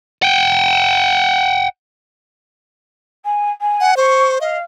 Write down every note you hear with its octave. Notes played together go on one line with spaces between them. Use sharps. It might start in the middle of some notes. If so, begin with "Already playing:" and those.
F#5 G5
G#5
G#5
F#5
C5 C#6
D#5 F5